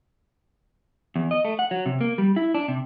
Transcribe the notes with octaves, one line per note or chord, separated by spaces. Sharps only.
E2
D#5
A3
F#5
F#3
C3
A#3
G3
E4
D4
C3